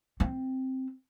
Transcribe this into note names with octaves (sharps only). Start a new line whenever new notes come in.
C4